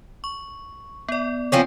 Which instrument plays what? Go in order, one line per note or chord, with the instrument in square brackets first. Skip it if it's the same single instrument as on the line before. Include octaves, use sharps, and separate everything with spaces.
[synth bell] C#6
B3 D5
[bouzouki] F3 C4 C#4